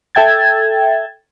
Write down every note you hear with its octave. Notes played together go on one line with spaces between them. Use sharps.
A4 E5 G5 G#6 A6